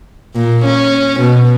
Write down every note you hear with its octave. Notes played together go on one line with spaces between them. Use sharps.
A#2
C#4
B2